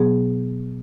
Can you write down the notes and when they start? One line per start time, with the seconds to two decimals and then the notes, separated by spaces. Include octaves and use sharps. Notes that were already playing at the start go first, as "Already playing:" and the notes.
Already playing: B2 F#3 B3 G#4